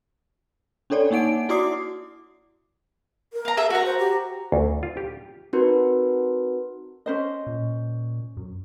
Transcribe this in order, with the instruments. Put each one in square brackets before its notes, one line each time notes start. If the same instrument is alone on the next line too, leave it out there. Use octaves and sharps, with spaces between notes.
[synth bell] C#4 D4 A4 C#5 D5
A#3 D4 D#4 F#5 D7
E4 F#4 D5 D6 D#6 C7
[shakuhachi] A#4
[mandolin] F5 A#5
G#4 A4 E5
[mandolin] F#4 A#5 [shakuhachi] F#5
[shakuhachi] C5
G4
[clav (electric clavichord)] D2
F4
G4
[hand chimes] C4 D#4 F#4 A#4 B4
[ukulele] C#4 C5 D#5
[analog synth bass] A#2
F#2